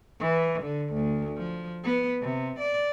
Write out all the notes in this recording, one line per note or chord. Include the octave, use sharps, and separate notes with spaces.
E3
D3
D2
F3
B3
C3
D5